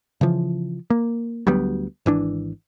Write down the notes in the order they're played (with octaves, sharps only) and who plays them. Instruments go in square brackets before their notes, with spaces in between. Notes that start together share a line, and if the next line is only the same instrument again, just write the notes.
[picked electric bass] C#3 E3 F3
A#3
D2 F#3 G3 B3
G#1 E3 D4